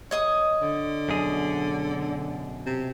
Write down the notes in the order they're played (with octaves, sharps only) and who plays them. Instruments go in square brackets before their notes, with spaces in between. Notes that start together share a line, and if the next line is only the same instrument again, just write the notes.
[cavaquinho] C#5 D#5 D#6
[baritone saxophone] D3
[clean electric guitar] F#2 B2 G#4
[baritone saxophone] C3